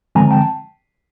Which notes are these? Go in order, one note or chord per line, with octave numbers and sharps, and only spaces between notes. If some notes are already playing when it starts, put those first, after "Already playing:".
D3 F3 G#3 C4 G#5 A#5
G5 A5